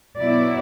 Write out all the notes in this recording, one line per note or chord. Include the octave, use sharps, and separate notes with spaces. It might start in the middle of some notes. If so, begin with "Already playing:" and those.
B2 F#3 B3 E4 D5